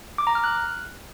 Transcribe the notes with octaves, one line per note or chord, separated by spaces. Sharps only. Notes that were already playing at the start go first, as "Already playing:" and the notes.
D6
A#5
F6
F#6